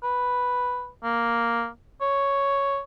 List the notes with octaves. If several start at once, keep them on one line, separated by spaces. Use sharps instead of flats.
B4
A#3
C#5